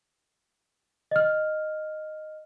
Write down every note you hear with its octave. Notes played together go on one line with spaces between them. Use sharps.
D#5 F6